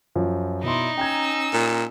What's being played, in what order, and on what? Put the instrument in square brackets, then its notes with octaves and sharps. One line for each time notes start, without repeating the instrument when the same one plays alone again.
[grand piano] F#2 F3
[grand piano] B2 C6 [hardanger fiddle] D#4 [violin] E4 D5
[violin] C#4 E6 [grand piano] G5 A#5 G#6
[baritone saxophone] A#2